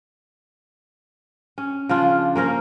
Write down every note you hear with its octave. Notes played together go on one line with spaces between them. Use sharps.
C#4
C#3 F3 D4 F4
A#3 C#4 A#4 C5